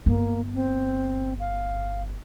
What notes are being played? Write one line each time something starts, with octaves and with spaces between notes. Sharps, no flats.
G1 A#3
C4
F5